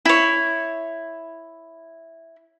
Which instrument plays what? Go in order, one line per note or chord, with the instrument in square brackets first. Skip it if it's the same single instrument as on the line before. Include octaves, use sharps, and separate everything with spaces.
[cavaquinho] E4 C#5